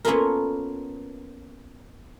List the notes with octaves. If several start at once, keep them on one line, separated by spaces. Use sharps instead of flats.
A#3 B3 C#4 F4 A4 A#4